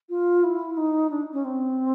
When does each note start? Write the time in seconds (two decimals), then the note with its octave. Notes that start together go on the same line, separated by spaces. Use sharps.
0.09 F4
0.44 E4
0.77 D#4
1.10 D4
1.33 C#4
1.45 C4